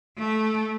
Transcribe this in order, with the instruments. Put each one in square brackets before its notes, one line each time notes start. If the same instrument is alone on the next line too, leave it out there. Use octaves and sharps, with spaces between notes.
[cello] A3